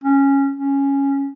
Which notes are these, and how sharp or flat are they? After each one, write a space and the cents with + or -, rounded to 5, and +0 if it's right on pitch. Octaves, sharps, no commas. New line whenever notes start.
C#4 -10
C#4 -5